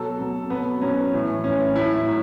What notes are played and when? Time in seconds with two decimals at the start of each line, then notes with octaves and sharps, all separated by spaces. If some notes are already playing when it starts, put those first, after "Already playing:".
Already playing: B2 F#3 A4
0.19 B2 F#3
0.50 B2 F#3 B3
0.81 B2 F#3 C#4
1.13 A2 E3
1.44 A2 E3 C#4
1.75 A2 F#3 E4
2.07 A2 F#3